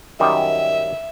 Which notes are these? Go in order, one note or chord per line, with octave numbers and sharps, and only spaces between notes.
F#2 D#3 G3 E5